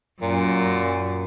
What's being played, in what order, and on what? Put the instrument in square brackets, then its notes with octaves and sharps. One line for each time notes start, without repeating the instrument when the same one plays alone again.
[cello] F#2 [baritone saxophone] A#2